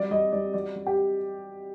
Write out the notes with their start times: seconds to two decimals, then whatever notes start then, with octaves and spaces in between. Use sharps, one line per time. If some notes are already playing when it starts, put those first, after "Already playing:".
Already playing: F#3 G3 D5
0.11 G3 D#5
0.32 G3 D5
0.54 F#3 D5
0.75 F#3
0.87 G4